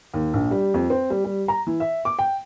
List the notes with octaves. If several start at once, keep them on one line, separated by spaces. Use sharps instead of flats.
D#2
A#1
G3
F2
C4
G3
G3
A#5
E3
E5
D6
G5